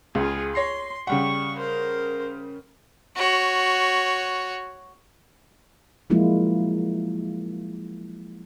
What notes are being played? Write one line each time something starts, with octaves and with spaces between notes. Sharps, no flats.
C#2 F4 G#4
C#5 C6 A#6 C7
C#3 G3 F#5 C#6
A#4 C5
F#4 C#5
F3 F#3 G#3 A#3 E4 F4